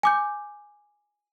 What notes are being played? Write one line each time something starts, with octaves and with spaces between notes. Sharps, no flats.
G#5 D6 G6